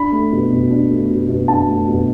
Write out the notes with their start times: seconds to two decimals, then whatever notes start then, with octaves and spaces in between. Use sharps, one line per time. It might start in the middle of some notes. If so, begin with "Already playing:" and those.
Already playing: D4 B5
0.12 A3
0.32 B2
0.52 B2
0.71 D4
0.90 A3
1.10 B2
1.29 B2
1.48 D4 A5
1.68 A3
1.88 B2